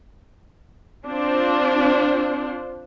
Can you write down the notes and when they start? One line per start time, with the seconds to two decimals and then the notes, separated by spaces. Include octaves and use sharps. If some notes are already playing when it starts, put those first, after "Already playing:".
1.07 C4 D4 F4 C5